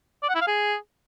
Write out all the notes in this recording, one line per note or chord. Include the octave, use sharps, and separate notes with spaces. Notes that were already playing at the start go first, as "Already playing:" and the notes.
D5
F#5
E4
F5
G#4